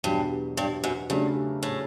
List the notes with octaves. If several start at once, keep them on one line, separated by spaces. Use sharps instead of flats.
E2 G2 B2 F#3
G2
F#2
G2 C#3 F#3 A3 D4
A2